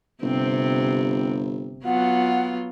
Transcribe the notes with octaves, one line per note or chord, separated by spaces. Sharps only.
G1 C3 C4
F#3 B3 F4 F#5